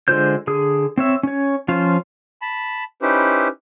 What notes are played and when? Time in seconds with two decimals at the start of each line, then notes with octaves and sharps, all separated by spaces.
0.08 D3 G#3 F4 C5 G6
0.47 D3 G#4 D#6
0.97 C4 C#5 E5
1.23 C#4 C#5
1.68 F3 C#4 F4 C5 F5
2.42 A5 B5
3.02 C#4 D#4 E4 G4 B4 C5